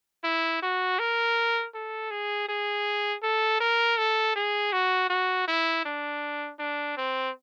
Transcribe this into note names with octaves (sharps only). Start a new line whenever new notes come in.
E4
F#4
A#4
A4
G#4
G#4
A4
A#4
A4
G#4
F#4
F#4
E4
D4
D4
C4